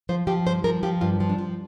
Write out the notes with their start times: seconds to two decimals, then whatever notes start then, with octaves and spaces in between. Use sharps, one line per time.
0.09 F3 C5
0.27 F3 G4
0.46 G2 C5
0.64 F3 A#4
0.83 F3 G4
1.01 G2 F4
1.20 F3
1.29 D4
1.39 F3